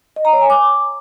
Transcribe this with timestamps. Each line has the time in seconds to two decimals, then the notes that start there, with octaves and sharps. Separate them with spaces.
0.16 D#5
0.25 A#5
0.33 C#5
0.41 G#5
0.50 D6